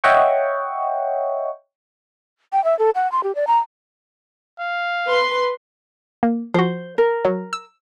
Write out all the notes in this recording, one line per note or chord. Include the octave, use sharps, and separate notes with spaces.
C#5 D#5 E5 F#5 G5 C#6
G5
E5
A4
F#5
C6
G4
D5
A#5
F5
B4 C6
A#3
F3 F#4 C5
A#4
F#3
E6